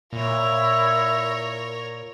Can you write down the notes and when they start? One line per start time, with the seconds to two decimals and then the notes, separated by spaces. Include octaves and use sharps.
0.13 A#2 E4 A#4 C#5